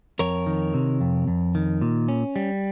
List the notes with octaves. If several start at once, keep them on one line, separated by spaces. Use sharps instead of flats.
F2 A#4 C#5
D#3
C3
F2
F2
D#3
A#2
C#4
G3